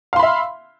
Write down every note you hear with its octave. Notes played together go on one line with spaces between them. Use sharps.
E5 F5 B5 C6